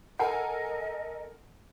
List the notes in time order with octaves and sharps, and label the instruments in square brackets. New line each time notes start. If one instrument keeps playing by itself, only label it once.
[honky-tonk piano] A4 A#4 G#5 [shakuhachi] D#5 [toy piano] F#5